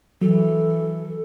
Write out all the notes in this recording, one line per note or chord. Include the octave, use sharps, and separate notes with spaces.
E3 F#3 A4